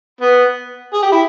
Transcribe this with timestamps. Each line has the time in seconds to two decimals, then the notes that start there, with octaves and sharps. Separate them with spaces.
0.21 B3
0.94 G#4
1.03 G4
1.12 E4